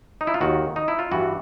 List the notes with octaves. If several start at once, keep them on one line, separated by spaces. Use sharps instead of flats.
D#4
E4
F4
D#2 D#3 F#4
D#4
E4
F4
G2 E3 F#4